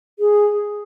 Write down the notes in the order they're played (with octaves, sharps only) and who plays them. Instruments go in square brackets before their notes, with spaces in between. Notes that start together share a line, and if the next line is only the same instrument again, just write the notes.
[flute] G#4